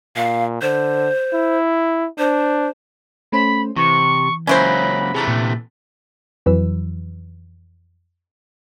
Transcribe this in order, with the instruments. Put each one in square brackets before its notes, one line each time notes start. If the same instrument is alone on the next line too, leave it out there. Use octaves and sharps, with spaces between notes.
[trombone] A#2 [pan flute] F5
[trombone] D3 [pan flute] C5
[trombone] E4
[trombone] D4 [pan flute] C5
[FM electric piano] A3 C#4 C5 [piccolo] B5
[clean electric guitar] C3 [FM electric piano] E3 [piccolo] C#6
[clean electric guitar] C#2 F#3 A#3 [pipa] C#4 E4 C5 [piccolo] B5
[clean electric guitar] C3 E3 A3 [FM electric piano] G#4 A5 A#5
[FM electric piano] A#2
[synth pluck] F2 E3 F#3 B4 E6